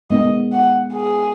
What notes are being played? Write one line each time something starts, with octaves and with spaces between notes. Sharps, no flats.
G#3 B3 D#4 D#5
F#5
G#4